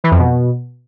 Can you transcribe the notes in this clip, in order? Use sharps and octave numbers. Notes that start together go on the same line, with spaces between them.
E3
F2
B2